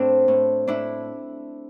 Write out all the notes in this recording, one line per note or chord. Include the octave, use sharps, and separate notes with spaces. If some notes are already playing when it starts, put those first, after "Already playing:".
Already playing: A2 C4 D4
A2
A2 D4 E4